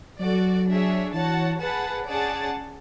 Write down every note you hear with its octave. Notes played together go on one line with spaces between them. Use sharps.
F#3 F#4 A4 D5
D4 G#4 C#5 E5
E3 F#4 C#5 F#5 A5
G#4 B4 F#5 A5
C#4 G#4 D5 F#5 A5